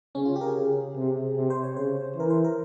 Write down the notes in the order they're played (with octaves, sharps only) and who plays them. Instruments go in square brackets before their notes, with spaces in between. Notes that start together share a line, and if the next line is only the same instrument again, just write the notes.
[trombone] C#3 [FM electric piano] C#4
[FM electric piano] F4
G4
A#4
G#4
[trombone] C#3
C3
C3
[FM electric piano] C5
C#5
[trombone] C#3 [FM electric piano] C5
[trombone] E3 [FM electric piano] A#4
[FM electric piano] C5
A#4